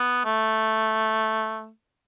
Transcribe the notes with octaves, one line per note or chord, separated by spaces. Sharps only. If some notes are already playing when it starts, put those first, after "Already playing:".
Already playing: B3
A3